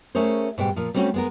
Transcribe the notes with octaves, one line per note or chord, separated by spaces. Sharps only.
A3 C#4 G#4 A#4 C5
G#2 B2 G3 G5
A#2 F3
G3 A3 C4 C#4 F#4
G#3 B3 A#4